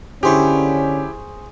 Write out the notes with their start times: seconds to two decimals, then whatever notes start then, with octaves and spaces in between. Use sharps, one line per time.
0.23 D3 C#4 E4 G4 G#4 C5 C#6